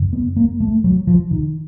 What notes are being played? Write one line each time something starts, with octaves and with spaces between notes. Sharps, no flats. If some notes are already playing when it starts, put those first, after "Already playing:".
Already playing: F#2 C#3
B3
A#3
A3
F#3
F3
D#3